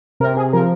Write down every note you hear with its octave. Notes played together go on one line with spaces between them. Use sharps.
C3 A#4
G#4
F3 A#4